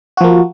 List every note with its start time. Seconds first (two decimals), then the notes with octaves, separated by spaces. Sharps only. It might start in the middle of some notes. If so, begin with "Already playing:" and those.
0.17 F#4
0.21 F3
0.24 A#3